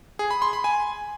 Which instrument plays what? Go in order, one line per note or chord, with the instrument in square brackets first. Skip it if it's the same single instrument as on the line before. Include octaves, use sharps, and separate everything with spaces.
[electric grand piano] G#4
B5
C6
B5
G#5